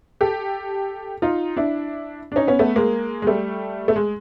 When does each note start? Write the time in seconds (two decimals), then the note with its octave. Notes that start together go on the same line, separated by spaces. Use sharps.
0.21 G4 A4
1.22 D#4 F4
1.57 D4 E4
2.32 D4
2.36 C#4 D#4
2.47 B3 C#4
2.59 A3 B3
2.76 G#3 A#3
3.22 G#3
3.27 G3 A3
3.88 A3
3.96 G#3